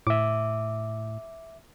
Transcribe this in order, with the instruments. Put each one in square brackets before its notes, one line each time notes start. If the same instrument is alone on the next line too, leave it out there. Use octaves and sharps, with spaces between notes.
[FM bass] A2 [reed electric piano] E5 D6